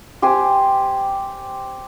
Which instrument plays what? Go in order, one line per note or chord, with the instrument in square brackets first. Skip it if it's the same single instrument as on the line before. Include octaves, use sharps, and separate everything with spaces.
[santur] G4 C5 G#5